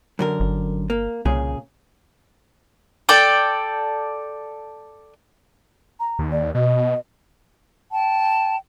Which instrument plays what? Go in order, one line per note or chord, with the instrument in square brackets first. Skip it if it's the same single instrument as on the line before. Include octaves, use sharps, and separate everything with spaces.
[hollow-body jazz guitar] F#2 D3 A#4
[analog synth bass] G1
[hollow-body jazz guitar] A#3
[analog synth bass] C2 [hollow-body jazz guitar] A#2 C#3 G#4
[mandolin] A4 D5 G5
[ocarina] A#5
[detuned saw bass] D#2
[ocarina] D5
[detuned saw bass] B2 [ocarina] D#5
[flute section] G5 A5